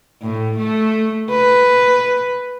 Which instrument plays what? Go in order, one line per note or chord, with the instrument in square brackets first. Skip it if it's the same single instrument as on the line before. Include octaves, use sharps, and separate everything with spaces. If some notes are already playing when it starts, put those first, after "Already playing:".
[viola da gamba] A2
A3
B4